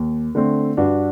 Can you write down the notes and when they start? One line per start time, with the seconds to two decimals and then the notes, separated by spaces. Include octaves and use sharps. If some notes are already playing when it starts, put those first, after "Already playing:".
Already playing: D#2
0.35 D3 A3 C4
0.77 G2 D4 F#4